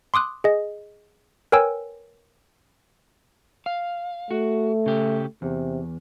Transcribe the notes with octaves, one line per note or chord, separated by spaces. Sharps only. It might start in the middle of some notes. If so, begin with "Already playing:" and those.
C6 D6 D#6 F#6
G#4 D#5
A#4 B4 C#5 G5 G#5 E6
F5
A3 F#4
C#3 G4
E2 C3